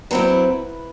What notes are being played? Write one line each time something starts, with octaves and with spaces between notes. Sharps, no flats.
F#3 C4 E4 B4